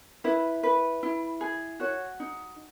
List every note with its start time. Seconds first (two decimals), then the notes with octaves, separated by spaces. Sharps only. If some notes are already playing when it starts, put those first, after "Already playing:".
0.24 E4 B4
0.63 B4
1.03 E4
1.41 G#4
1.80 F#4 C#5
2.20 D#4